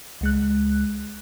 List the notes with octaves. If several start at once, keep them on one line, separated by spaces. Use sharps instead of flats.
C#2 G#3 F#6